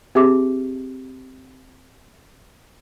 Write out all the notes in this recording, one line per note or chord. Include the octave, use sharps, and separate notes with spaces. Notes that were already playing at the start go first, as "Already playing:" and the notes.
C4 G4 G#4 E5 D6